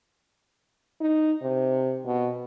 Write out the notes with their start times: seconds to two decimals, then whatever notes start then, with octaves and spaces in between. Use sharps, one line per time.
1.01 D#4
1.42 C3
2.06 B2